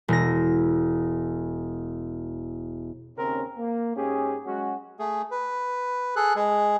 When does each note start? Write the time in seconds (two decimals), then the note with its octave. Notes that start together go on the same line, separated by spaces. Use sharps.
0.08 E1 A#6
3.17 D#2 C#3 C4 C#4 A#4
3.57 A#3
3.96 G#2 C#4 G4 G#4
4.45 F#3 G#3 C#4 F#4
4.99 A3 G#4
5.31 B4
6.16 G#4 A4 F#6
6.36 G#3 G#4